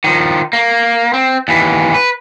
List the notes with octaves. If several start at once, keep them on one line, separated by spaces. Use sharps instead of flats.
D#3 F3
A#3
C4
D#2 E3
B4